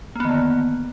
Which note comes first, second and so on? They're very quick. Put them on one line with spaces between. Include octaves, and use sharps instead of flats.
A#3 B3 D#3 D3